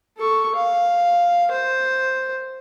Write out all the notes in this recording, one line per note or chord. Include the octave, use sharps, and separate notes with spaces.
A4 C#6
F5
C5